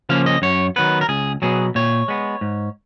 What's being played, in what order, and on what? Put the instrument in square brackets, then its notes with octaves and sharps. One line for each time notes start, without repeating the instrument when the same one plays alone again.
[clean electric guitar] C#3 F3 A#3 C#4 F5
D#5
F#2 C#5
D#3 F#3 B3 B4
A#4
C#2 G#4
B2 F#3 B3 G#4
A#2 C#5
G#3 B3
G#2